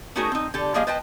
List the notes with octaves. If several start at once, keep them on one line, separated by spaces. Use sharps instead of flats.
A3 C#4 D#4 F#4 G#4 A#4
C4 D#4
D3 G4 A4
F3 G3 A#3 G#4 D#5 F5
B4 C5 D#5 G5 A5